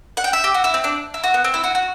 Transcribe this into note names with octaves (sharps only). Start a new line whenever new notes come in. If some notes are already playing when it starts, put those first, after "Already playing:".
F#5
G5
E5
G4
F#4
E4
C4
D4
E4
F#4
B3
C4
E4
F#4
F#4